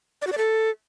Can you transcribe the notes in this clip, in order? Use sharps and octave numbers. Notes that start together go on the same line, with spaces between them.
D5
F#4
D5
A4